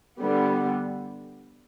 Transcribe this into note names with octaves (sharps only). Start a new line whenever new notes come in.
D3 G3 B3